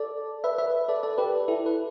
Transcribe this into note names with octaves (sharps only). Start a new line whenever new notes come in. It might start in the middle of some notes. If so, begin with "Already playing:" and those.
Already playing: A4 D5
B4 E5
B4 E5
A4 D5
A4 D5
G4 B4
E4 A4
B4